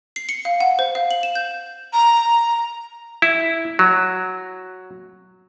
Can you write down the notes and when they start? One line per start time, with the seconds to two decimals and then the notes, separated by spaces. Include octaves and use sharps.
0.16 C7
0.29 C#7
0.45 F5
0.60 F#5
0.79 C5
0.95 F5
1.11 F#7
1.23 E7
1.35 G6
1.93 A#5
3.22 E4
3.79 F#3